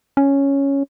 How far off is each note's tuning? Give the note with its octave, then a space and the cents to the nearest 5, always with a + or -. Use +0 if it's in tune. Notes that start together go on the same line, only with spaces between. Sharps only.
C#4 +0